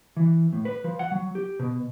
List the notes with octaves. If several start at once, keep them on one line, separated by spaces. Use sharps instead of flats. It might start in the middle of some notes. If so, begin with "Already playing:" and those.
E3
A2
B4
F3
F#5
F#3
G4
B2